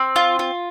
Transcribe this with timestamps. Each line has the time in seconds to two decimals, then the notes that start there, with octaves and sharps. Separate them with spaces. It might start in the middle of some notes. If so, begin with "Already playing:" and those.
Already playing: C4
0.16 F4
0.39 F4